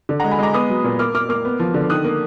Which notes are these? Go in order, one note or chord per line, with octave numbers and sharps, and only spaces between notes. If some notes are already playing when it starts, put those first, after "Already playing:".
D3
G#3 F#5 A#5
G#5 B5
G#3 A#5 D6
B3 B5 D#6
F#3
A#2
A#3 D6 F6
A#3 D6 F6
A#3 D6 F6
B3
F3
D3
D#3 D#6 F#6
A#3